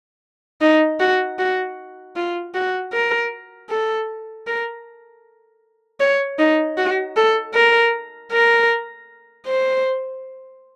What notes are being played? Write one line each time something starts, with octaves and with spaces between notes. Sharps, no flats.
D#4
F#4
F#4
F4
F#4
A#4
A4
A#4
C#5
D#4
F#4
A4
A#4
A#4
C5